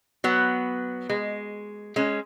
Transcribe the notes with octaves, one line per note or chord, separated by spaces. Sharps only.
F#3 B3
G#3
G#3 C#4